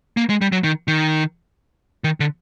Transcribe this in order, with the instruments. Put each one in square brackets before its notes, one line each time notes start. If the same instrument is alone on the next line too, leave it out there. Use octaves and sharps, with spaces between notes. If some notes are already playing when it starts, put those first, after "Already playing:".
[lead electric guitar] A#3
G#3
G3
F#3
D#3
D#3
D#3
D3